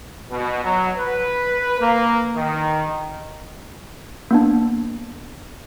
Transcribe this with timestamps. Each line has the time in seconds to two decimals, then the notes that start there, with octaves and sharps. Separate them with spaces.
0.30 B2
0.64 F#3
0.98 B4
1.80 A#3
2.35 D#3
4.31 A#3 B3 D4